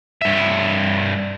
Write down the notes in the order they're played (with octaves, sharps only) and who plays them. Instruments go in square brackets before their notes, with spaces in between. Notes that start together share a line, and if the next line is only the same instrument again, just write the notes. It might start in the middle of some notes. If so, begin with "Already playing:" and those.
[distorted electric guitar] G2 E5